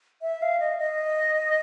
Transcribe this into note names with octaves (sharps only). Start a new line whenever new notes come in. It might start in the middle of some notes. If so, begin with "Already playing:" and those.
E5
F5
D#5
D#5